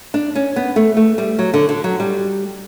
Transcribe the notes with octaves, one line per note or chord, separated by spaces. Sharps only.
D4
C#4
B3
A3
A3
G3
F#3
D3
D3
F#3
G3